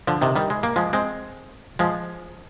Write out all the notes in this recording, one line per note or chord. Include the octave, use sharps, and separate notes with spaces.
D3 F3
C3 D#3
D#3 G3
G#3
A#3
F3 G#3
G#3 C4
F3 G#3